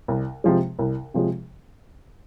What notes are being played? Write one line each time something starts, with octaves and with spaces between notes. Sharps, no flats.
C2
C3 F3 G#3
C2
C3 F3 G#3